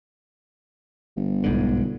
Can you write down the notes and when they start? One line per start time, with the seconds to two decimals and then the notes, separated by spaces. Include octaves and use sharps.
1.17 G1
1.44 B1 G#2 D3